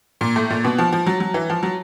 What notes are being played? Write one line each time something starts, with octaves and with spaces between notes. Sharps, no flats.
A#2
A2
A#2
B2
F3
F3
F#3
F#3
E3
F3
F#3